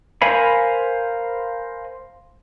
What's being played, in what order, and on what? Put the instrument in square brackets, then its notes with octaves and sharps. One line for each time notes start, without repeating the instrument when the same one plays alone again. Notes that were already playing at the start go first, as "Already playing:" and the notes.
[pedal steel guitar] A#4 C5 F5 G#5 B5